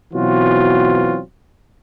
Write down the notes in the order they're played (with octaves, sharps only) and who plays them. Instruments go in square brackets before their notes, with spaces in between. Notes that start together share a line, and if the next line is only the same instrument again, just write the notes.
[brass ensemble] B2 E3 F#3 C4 F4 F#4